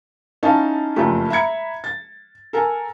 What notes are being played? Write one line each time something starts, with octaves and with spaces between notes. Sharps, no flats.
C#4 D#4 E4 F5 A5
F#1 F2 A3 G4
E5 A#5 B5 G#6 C#7
A6
A4 A#4 G#5